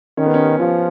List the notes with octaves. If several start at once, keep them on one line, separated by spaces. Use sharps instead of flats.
D#3 C#4
B3
C#4
F3 F4